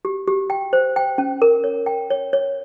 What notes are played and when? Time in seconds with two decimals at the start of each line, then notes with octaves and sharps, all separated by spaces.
0.05 G4
0.27 G4
0.50 G5
0.73 C5
0.96 G5
1.18 C#4
1.42 A#4
1.64 C#5
1.86 G5
2.10 C#5
2.33 C#5